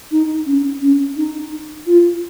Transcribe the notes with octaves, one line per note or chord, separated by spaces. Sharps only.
D#4
C#4
C#4
D#4
F4